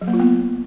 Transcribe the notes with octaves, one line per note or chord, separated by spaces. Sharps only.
F#3
A#3
F4
B3